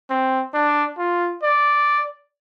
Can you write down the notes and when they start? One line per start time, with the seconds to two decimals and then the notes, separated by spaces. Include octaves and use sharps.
0.10 C4
0.54 D4
0.98 F4
1.43 D5